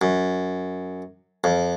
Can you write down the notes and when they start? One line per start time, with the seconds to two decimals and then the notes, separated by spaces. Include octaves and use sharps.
0.01 F#2
1.44 F2